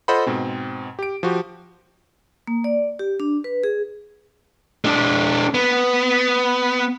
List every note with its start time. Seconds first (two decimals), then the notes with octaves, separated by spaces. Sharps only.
0.08 F4 A4 C5 D#5 F#5 B5
0.27 G#2 B2 C4
0.99 G4 D7
1.23 F3 F#4 G4
2.47 A#3
2.64 D5
2.99 G4
3.20 D4
3.44 B4
3.64 G#4
4.85 G#3 D4
5.54 B3